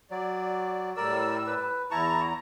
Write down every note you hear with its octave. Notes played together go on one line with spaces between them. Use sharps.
F#3 D5
A2 G3 A#4 D5 E6
B4
E2 E4 A5 A#5 C#6